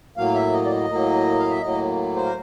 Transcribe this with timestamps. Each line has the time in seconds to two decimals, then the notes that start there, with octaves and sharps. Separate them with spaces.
0.17 A2 F#3 A#3 F5
0.35 E5
0.53 D#5
0.66 D5
0.71 D#5
0.89 A2 F#3 A#3
1.39 F5
1.51 E5
1.61 A2 F#3 A#3 D#5
2.16 C5
2.24 A#4